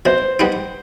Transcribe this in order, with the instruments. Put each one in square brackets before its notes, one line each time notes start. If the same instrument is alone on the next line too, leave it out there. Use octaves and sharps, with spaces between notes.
[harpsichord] B2 [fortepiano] C5
[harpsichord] G3 B3 D#4